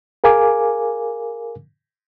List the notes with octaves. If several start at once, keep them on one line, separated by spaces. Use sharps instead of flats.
G#4 A#4 F5 G#5 D6